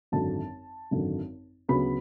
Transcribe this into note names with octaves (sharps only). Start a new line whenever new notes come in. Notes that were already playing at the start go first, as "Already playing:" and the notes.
G#1 F#2 D3 F#3 A5
G#1 F#2 D3 F#3
D2 C#3 F#3 B3 B5